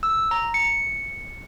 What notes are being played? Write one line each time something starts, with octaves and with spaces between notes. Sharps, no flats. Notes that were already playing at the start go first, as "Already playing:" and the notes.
E6
A#5
C#7